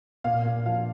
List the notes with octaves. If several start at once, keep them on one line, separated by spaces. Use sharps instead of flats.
A#2 F5
A#2
F3 F5